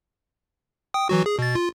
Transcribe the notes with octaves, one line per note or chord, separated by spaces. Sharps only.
G5 D#6
E3 F#3 F#4
G#4
B2 A6
F4